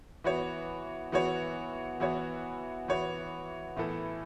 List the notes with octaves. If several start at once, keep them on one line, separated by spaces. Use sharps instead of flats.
E3 B3 F#4 C#5
E3 B3 F#4 C#5
E3 B3 F#4 C#5
E3 B3 F#4 C#5
A2 E3 B3 E4 A4